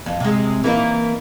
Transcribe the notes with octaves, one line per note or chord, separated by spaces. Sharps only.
F2
C3 G#3
E3 A#3 D#4